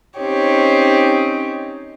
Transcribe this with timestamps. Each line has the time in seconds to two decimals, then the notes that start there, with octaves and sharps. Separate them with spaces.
0.18 C4 C#4 D#4 G4 C#5